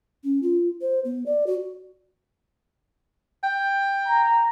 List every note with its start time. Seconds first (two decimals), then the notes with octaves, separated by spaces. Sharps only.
0.24 C#4
0.43 F4
0.81 C5
1.05 B3
1.26 D5
1.47 F#4
3.44 G5
4.07 A#5